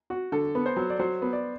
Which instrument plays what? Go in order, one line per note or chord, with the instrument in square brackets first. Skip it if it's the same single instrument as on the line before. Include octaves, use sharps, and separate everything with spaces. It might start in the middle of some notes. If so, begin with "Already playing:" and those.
[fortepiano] F#4
[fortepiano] D3 [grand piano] A4
[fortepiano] B3
[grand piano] C5
[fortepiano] F#3
[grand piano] D5
[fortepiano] F#3 [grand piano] C5
[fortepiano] B3
[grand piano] D5